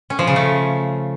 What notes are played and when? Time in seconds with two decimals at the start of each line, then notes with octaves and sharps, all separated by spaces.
0.10 C#4
0.19 F3
0.27 C#3
0.36 A3